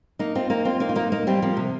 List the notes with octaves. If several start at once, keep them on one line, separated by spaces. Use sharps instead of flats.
A#3 D#4
C4 F4
A#3 D#4
C4 F4
A#3 D#4
F4
A#3 D#4
A#3 D#4
G3 C4
F3 A#3
C3